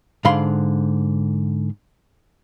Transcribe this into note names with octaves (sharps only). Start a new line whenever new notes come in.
G#2 D3 F5 B5 C6